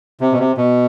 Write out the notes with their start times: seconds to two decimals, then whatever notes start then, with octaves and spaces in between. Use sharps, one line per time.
0.20 C3
0.32 B2
0.39 C3
0.57 B2